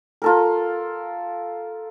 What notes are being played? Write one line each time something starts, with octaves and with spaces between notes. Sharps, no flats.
F4 A4 A#4